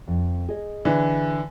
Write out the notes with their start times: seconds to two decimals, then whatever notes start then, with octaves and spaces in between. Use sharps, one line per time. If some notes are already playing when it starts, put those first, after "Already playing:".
0.08 F2
0.49 G#4 D#5
0.85 D3 E3